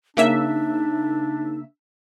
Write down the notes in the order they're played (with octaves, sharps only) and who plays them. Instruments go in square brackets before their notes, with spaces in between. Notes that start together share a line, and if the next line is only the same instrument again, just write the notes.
[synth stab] C#3 A#3 E5 [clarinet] D4 [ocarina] D#4